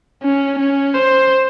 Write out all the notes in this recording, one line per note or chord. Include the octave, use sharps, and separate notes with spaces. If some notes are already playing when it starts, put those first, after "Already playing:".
C#4
C#4
C5